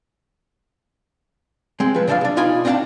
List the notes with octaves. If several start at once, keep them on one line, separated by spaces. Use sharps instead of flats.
G#3 C4
F3 B4
C#3 F3 D4 D#5 F5
C2 D4
B2 D#4 F4 D5 G#5 B5
C4 D4 D5 F5 G5 A5